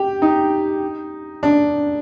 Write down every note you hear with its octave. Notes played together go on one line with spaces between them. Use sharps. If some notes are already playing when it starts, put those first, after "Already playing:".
Already playing: G4
D#4
D4